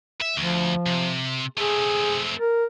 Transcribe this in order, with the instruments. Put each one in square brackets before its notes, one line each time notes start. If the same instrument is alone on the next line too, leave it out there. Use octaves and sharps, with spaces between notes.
[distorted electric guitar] E5
[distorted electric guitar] D2 [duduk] F3
[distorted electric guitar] C3
[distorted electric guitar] A3 C4 [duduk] G#4
[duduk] A#4